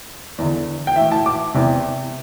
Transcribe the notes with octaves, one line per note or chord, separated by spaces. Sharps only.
E2 D3
G5
A2 E3 E5
A5
D6
E2 C3 E3